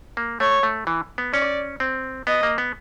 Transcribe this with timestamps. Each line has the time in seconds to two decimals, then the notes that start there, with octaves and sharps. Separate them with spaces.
0.17 A#3
0.40 A3 C#5
0.63 A3
0.87 E3
1.18 B3
1.33 C#4 D5
1.80 C4
2.27 B3 D#5
2.43 A#3
2.58 B3